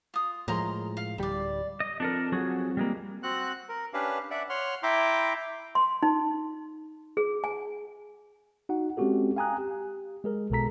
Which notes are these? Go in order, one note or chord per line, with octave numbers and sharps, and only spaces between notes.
F4 D#6
A2 F3 G#3 A#4 A#5 C6
F5
D1 G3 D5 B5
D#5
F2 D4 A4 A#4
F#3 F#4 G#4
G3 G#3 A#3
C4 F#4 F#5 F#6
A#4
C#4 D4 G4 B4 F5
D5 E5 F#5
C#5 F#5 C6 F6
E4 E5 G5 A#5 C6 D6
C6
D#4
G#4
G#5
D#4 F#4 F#5
G#3 C4 C#4 F#4 G4 A4
F5 G5 G#5 A#5 D#6 F#6
G4
G#3 G#4 A#4
B1 B2 G#3 A4 A#5 B6